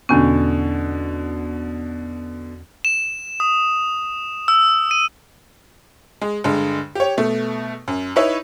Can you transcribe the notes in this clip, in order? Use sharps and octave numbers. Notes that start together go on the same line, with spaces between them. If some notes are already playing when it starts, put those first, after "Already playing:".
E2 B2 D3 C#4
E7
D#6
E6
D#7
G#3
G2 D3 G#3
G4 C#5
B2 A3
F#2
D#4 E4 B4 C#5 E5